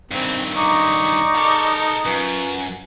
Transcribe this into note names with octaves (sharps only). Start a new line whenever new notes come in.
G2 D#3 C4
D#4 D5 C#6
A4 A#4
F#2 F4 B4